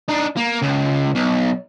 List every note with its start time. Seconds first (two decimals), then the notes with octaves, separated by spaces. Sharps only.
0.09 D4 D#4
0.37 A#3
0.62 C#2
1.15 B1